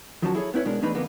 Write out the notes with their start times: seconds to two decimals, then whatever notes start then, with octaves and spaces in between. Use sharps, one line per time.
0.22 D#3 F3 F#3 C#4 F#4 A5
0.35 E4 G#4 A4 C#5
0.54 B3 C4 E4 B4 C#5
0.65 B2 G#3 D4 A#4
0.82 E2 A3 D4 D#4 B4 B5
0.95 F2 D3 A#3 B3